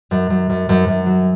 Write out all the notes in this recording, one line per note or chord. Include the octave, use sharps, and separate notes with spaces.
F#2
F#2
F#2
F#2
F#2
F#3